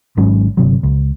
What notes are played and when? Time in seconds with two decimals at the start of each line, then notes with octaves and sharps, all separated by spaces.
0.17 G#1 G#2 F#3 C#4
0.57 G1 C3 F#3
0.83 C#2